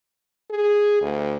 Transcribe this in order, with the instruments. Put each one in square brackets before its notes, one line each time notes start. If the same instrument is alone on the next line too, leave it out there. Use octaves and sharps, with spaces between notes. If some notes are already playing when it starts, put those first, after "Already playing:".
[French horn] G#4
D2